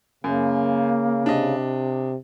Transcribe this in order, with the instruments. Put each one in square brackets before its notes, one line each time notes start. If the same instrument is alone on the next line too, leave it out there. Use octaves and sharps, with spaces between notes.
[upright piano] F#2 [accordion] C#3 [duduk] A#3
[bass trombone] C3 [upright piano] D4 D#5